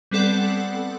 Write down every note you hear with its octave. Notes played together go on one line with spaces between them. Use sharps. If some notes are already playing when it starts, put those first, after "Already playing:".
G3 B3 C4 A4 D5 F#5